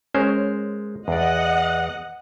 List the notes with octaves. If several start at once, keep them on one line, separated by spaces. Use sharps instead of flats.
G#3 C#4 A#4 C5
E2 D5 D#5 F#5